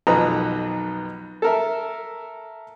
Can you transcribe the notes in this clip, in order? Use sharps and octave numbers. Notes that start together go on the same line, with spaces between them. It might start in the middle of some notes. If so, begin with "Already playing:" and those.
B1 F2 D#3 B4 A#5 D#6
A4 A#4 E5